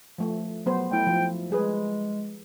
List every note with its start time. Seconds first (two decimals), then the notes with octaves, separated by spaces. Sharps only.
0.18 F3 A3
0.66 F#3 B3 C5
0.91 A3 E4 G5
1.07 F3
1.50 G3 G#3 G#4 B4